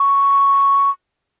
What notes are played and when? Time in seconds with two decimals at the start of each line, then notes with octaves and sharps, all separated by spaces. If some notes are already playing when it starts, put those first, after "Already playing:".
Already playing: C#6